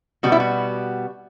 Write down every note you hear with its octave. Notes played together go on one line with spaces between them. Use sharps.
B2 G3 B3 F#4
E4
F#4